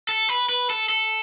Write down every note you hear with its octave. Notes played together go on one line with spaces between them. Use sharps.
A4
B4
B4
A4
A4